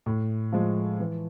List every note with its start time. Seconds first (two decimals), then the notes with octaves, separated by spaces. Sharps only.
0.06 A2
0.52 F3 G#3
0.99 E3